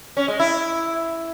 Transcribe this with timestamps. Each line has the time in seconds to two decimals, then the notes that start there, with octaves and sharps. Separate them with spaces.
0.17 C#4
0.28 G#3
0.40 E4